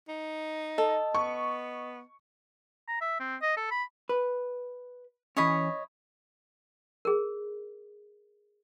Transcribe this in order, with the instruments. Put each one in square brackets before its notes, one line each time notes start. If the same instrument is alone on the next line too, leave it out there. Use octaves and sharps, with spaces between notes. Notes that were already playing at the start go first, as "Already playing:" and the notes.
[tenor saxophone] D#4
[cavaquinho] A4 [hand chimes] D#5
[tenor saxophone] B3 [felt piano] C#6
[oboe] A#5
E5
C4
D#5
A4
B5
[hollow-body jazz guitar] B4
[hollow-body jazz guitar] E3 C#4 [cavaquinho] C#5 D#5 B5
[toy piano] G#4 A#4